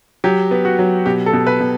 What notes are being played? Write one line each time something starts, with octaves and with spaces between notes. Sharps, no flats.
F#3 G4
B3
F#4
F#3
B2 G4
A4
B2
B4
B2